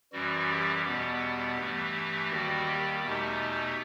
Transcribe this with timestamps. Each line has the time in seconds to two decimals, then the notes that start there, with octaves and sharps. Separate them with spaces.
0.12 F#2 E3 G3 F#4
0.49 G4
0.85 E2 B2 G3 B3 G4
1.58 G2 E3 A3
2.30 D#2 D#3 G3 F#4
2.66 G4
3.02 E2 B2 A3 D#4 G4